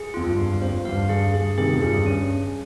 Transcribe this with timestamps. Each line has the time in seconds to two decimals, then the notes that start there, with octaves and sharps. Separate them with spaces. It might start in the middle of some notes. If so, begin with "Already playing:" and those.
Already playing: G#4
0.14 F2 F4
0.26 G2
0.38 F5
0.54 G2
0.62 F2 C5
0.85 G2 F5
1.09 G2 G#4
1.34 G2 G#4
1.58 C3 D#3 G#4
1.73 F2
1.83 G2 G#4
2.06 G2 C#4